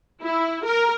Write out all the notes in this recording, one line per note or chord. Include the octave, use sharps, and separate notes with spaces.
E4
A#4